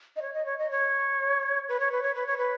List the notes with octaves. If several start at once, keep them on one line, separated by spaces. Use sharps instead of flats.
D#5
C#5
D#5
C#5
D#5
C#5
B4
C#5
B4
C#5
B4
C#5
B4